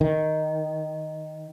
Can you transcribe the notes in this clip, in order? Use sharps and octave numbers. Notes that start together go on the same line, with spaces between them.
D#3